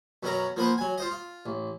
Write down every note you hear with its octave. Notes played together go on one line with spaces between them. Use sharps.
F#2 B2 F#3 C#4 A#4 A#5
F3 A#3 B3 B4 C5
F#3 G#5
F4 C5 D#5
F4
A1